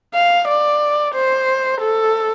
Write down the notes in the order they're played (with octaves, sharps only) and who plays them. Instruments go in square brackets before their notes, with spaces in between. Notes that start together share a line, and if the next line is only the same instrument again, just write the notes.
[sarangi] F5
D5
C5
A4